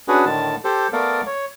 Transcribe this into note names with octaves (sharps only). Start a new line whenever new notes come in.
C#4 D4 F#4 G#4 B4
A2 D3 D#3 A5
G4 A4 C5
A3 B3 A4 A#4 D5 F5
C#5